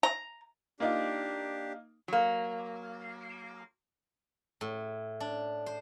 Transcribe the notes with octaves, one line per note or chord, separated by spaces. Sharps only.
A#5
A#3 D4 D#4 F4 G4
F#3 A#3
A2
D4
C5